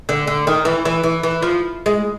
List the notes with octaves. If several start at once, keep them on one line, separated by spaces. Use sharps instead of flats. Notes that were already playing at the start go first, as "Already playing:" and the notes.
D3
D3
D#3
E3
E3
E3
E3
F3
G#3